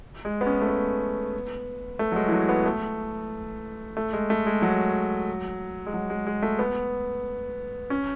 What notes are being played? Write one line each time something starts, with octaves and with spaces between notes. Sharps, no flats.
G#3
B3
C#4
A3
B3
A3
F#3
G#3
E3
F#3
B3
A3
A3
G#3
A3
G#3
F#3
G#3
F#3
G#3
G#3
A3
B3
C#4